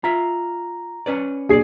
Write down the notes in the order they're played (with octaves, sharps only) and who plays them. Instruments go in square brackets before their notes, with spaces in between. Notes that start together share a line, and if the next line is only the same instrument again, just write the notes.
[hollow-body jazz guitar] F4 E5 [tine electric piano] A#5
[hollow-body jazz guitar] C#4 B4 D5
[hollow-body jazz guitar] B1 C#5 D5 [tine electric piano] A#3 D4 C7 [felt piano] G#4